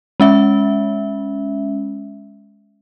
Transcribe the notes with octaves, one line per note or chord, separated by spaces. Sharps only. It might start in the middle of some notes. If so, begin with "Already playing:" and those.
G#3 C#4 E5